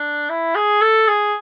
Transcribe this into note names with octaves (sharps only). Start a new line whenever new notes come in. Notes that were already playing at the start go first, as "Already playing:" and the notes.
Already playing: D4
E4
G#4
A4
G#4